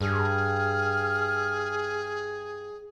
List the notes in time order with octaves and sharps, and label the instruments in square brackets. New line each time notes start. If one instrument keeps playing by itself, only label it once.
[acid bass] G2 [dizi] G#4 [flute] F6